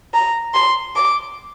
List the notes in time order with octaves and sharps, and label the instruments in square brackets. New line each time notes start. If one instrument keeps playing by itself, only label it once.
[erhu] A#5
C6
D6